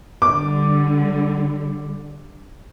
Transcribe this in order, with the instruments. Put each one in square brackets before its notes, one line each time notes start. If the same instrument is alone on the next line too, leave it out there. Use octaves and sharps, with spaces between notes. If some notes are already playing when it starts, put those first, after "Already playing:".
[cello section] D3 G3 [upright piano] D6